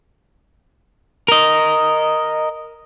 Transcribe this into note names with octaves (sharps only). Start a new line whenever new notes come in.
A#4 D#5